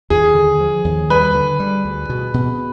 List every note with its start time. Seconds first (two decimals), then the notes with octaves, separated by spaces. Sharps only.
0.10 D#2 G#4
0.35 D3
0.60 F3
0.84 D#2
1.10 G3 B4
1.35 D3
1.60 G3
1.85 D2
2.09 B2
2.34 B2